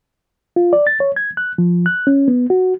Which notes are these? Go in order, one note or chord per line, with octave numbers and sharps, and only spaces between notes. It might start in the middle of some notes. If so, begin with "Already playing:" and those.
F4
D5
A6
C#5
G#6
F#6
F3
F#6
C#4
B3
F#4